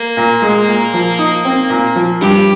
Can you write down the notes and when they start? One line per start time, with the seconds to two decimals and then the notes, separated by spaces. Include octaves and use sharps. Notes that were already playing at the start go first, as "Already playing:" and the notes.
Already playing: A#3
0.17 A#2
0.42 G#3
0.68 A#2
0.94 F3
1.19 D#4
1.45 C4
1.70 A#2
1.96 F3
2.20 G2 G4